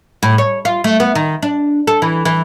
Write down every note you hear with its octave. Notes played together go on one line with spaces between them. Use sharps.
A2
C#5
F4
A3
B3
D#3
D4
A4
E3
E3